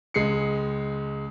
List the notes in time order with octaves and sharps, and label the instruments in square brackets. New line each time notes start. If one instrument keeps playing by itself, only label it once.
[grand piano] C#2 G#3 C7 C#7